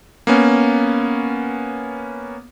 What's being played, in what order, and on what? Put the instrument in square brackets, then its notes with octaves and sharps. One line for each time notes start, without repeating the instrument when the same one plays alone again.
[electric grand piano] A#3 B3 C#4